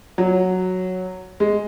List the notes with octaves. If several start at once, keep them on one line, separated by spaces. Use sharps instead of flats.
F#3
G#3